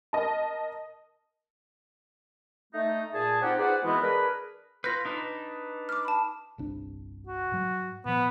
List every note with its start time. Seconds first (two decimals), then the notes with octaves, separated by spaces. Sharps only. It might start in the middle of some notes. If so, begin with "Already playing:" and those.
0.13 A#4 D#5 A5
2.73 A3 D#4
3.13 A#2 G#4 A5
3.41 C4 D#4 F4 G4 F#5
3.59 G#4 B4 C5 D5 F#5
3.83 B2 E3 G#3 B3 C4 E4
4.01 D4 G#4 A#4 B4
4.84 F4 B4 G6 A#6
5.05 D4 D#4 B4
5.89 D6 F6
6.05 A5 B5
6.58 G1 C2 D4
7.27 F#4
7.52 G#2 F#3
8.05 A#2 F3 B3